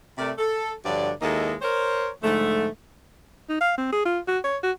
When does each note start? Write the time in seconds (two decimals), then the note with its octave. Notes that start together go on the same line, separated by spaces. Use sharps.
0.18 C3 A3 A#4 D5
0.38 A4
0.85 G2 D3 F3 F#3 D5
1.22 D#2 G#3 A#3 D#4 E4 A4
1.61 A#4 C5 C#5
2.23 G#2 D3 F3 A3
3.49 D#4
3.61 F5
3.78 C4
3.92 G#4
4.05 F4
4.28 F#4
4.44 C#5
4.63 F#4